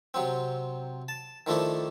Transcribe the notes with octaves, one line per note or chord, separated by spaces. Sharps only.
C3 F#3 C4
A5
D#3 F3 A3 D4 E4